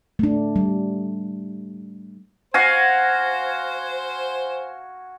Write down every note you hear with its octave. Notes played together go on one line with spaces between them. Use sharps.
A3 D4
G3
F#4 C5 F5 G#5